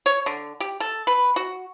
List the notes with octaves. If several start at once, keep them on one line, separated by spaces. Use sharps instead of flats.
C#5
D3
G4
A4
B4
F#4